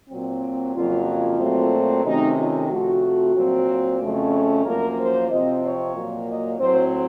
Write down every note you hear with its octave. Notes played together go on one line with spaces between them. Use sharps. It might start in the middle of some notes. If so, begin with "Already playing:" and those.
A#2 F#3 C4
F2 C#3 F#3 A#3 F4
F4
A#2 F#3 A3 C4
C3 D#3 A3 C#4 D#4
F4
C3 F3 A3 F#4
A#2 F#3 C4
F2 C#3 A3 C#4
F#2 F3 A#3 A#4
C5
C3 F3 C4 D#5
C#5
A#2 F#3 A#3
D#5
A2 F#3 C4 C5